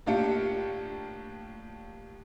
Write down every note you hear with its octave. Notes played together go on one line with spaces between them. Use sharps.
A2 A#3 D4 F4 G4 C#7